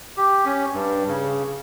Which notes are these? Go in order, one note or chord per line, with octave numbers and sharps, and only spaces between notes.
G4
C#4
G2
C#3